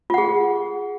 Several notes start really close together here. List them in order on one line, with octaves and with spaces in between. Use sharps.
F4 F#5 G#4